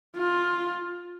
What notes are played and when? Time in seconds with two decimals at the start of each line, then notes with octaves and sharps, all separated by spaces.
0.17 F4